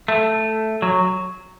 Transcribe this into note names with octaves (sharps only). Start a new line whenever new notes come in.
A3
F#3